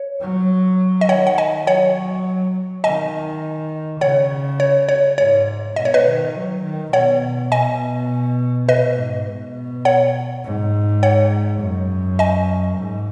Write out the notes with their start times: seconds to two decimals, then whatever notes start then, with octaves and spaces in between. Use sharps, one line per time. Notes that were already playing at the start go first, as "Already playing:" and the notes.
Already playing: C#5
0.21 F#3
1.01 D#5
1.09 D#3 C#5 F#5
1.27 F#5
1.38 D#5 G#5
1.67 F#3 C#5 F#5
2.84 D#3 D#5 G#5
4.00 C#3 C#5 F#5
4.60 C#5
4.89 C#5
5.18 G#2 C#5
5.76 B2 D#5
5.85 C#5
5.94 B4 D#5
6.06 D#3
6.35 F#3
6.64 D#3
6.93 B2 C#5 F#5
7.52 B2 D#5 G#5
8.68 B2 B4 D#5
8.98 G#2
9.27 B2
9.85 C#5 F#5
10.45 G#2
11.03 C#5 F#5
11.61 F#2
12.19 D#5 G#5
12.78 G#2